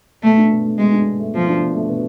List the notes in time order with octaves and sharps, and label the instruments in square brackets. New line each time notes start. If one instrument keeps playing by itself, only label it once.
[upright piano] B2 [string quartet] A3
[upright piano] D4
B2
A3
[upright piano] B2 [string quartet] G#3
[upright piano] D4
B2
A3
[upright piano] B2 [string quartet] F3
[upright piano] D4
B2
A3
B2